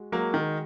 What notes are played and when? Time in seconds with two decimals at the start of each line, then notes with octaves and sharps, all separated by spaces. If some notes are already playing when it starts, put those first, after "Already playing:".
Already playing: G#3 F#4
0.12 F#3 G#3 A#3 F#4 A#4
0.34 D#3